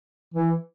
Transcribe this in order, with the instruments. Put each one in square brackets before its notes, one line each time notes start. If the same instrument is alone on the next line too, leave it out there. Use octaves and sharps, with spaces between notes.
[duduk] E3